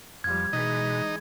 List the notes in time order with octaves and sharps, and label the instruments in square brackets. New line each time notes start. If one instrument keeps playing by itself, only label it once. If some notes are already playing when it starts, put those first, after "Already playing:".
[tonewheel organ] F2 [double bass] F3 G3 [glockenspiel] G#6
[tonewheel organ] B2 [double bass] E3 G#3 [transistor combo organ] D#4